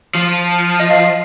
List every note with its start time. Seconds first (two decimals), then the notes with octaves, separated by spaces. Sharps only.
0.15 F3
0.80 D#5
0.90 F5